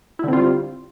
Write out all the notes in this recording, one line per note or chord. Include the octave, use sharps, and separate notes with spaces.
D3 G3 C4 E4 F4